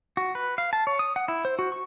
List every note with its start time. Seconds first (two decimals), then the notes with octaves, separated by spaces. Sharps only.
0.17 F#4
0.35 B4
0.58 F5
0.73 A5
0.87 C#5
0.99 D#6
1.16 F#5
1.28 E4
1.45 C5
1.59 F#4
1.72 C#6